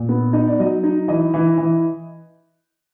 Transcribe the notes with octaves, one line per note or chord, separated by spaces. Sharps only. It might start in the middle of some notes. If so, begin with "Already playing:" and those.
Already playing: A#2
B3
D#4 D#5
D5
F#3 D#5
D#4
E3 D#5
E3
E3